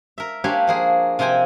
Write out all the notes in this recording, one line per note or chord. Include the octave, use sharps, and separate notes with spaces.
A#4 E5
A#3 D4 G4 C#5 G#5 C6
F3 A#3 G#4
C3 F3 C4 G5 G#5